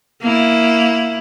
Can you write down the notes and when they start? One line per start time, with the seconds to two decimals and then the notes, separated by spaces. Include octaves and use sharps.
0.22 A#3 E4